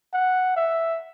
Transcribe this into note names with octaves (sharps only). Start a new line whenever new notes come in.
F#5
E5